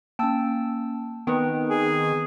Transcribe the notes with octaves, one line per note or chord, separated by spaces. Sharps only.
A#3 C#4 G5 A5 E6
D#3 B3 C4 B4 G5 D#6
G#4